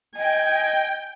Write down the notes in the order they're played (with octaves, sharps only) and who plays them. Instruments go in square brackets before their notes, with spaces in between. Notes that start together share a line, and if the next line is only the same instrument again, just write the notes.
[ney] D#5 [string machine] G5 [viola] G#5